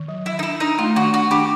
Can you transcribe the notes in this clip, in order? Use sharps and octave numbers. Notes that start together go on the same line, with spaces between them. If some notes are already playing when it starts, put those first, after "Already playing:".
Already playing: D#3
F#3
F#3 E4
D#4
D4 E4
D4 D#4
A3 F4
D#3 F#4
D4 F#4
D4 G4